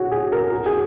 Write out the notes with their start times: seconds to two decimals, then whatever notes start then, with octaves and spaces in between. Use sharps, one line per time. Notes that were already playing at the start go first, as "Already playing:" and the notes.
Already playing: F#4 G#4 C#5
0.11 G#4
0.32 A#4
0.52 F#4
0.66 G#4